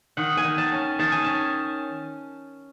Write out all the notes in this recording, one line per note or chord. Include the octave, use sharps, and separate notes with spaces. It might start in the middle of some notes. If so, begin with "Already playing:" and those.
D#3 F#5
G#5
D#3
A5
C#4
D#3 A5
G#5
C#4 A5